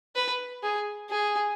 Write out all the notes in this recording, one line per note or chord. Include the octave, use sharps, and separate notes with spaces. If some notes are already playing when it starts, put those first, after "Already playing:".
B4
G#4
G#4